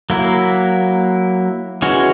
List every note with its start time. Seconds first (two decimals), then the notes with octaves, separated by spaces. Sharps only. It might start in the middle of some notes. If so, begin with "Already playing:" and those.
0.10 F#3 A#3 E4
1.82 E3 G#3 C#4 F#4